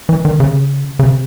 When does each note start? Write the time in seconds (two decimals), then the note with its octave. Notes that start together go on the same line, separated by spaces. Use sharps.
0.09 E3
0.25 D#3
0.40 C#3
0.99 C#3
1.03 C3